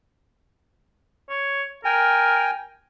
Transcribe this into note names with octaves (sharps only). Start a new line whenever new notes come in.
C#5
A#4 G5 G#5